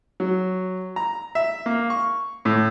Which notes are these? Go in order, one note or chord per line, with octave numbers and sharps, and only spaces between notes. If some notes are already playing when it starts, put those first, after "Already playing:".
F#3
A#5
E5
A#3
C#6
A2